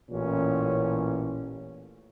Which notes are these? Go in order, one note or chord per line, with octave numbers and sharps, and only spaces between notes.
A1 A#2 E3 C#4